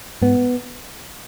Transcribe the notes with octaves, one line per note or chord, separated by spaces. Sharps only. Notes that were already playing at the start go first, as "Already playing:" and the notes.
G#2 B3